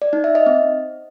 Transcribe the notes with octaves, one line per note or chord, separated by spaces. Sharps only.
D5
D#4
E5
D#5
C4